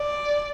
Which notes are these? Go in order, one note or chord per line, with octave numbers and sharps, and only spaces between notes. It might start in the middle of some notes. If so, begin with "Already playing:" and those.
Already playing: D5